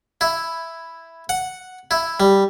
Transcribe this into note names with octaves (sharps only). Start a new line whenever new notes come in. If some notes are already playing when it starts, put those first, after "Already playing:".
E4
F#5
E4
G3